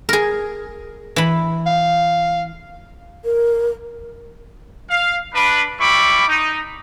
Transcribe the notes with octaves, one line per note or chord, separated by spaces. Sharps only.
G#4 A#4
E3 B5
F5
A#4
F5
D4 B4
G3 E4 B5 C#6 D6
D#4